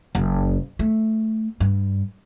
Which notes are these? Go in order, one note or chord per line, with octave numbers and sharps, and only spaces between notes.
F#1
A3
G2